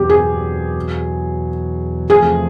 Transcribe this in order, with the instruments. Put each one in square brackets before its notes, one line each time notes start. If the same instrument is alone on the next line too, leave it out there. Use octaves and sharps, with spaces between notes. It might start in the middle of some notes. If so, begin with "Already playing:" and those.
Already playing: [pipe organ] E2 B2 F#3 [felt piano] G4
[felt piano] G#4
[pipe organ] E2 C3 F3 A3 [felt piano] G#4